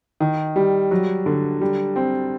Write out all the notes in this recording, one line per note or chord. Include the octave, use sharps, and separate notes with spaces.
D#3
G3
F#3
D3
G3
C4